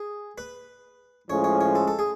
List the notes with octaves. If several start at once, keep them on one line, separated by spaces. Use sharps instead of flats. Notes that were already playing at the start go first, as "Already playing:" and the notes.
Already playing: G#4
B4
A2 F3 G#3 C#4 G#4 C#5
C#5
C#5
A4
A4
G#4